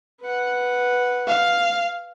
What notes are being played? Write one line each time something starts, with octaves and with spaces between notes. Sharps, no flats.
B4 F#5
F5